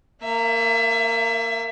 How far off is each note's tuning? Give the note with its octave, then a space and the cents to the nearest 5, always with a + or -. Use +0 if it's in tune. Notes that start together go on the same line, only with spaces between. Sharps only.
A#3 -20 E5 +25